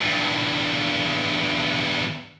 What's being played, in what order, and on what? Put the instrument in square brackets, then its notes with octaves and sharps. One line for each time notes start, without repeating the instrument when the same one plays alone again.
[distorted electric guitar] E2 G2